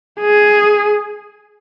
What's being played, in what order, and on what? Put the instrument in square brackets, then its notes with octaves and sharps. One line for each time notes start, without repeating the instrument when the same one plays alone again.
[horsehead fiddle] G#4